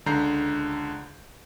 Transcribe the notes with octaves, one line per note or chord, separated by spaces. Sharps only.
C#2 D3 A#5 G6 C7